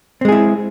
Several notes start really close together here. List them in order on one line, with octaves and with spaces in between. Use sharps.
C4 G#3 G#4 E4